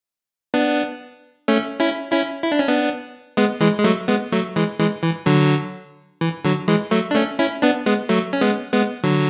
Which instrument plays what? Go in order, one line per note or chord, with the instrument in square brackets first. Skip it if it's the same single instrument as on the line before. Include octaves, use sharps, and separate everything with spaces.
[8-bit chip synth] B3 D4
A3 C#4
C#4 E4
C#4 E4
E4
D4
C#4
B3 D4
G#3 B3
E3 G#3
G#3
F#3 A3
G#3 B3
F#3 A3
E3 G#3
E3 G#3
E3
D3 F#3
E3
D3 F#3
E3 G#3
F#3 A3
D4
A3 C#4
C#4 E4
B3 D4
G#3 B3
F#3 A3
C#4
G#3 B3
G#3 B3
D3 F#3